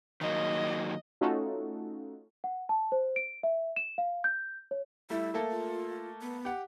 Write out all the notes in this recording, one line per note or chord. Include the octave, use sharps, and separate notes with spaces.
D#3 F#3 A#3 D#5
A3 C#4 D#4 F4 F#4 A4
F#5
A5
C5
D7
E5
E7
F5
G6
C#5
G3 A3 E4
A3 A#3 A4
F4
B3
G4 F#5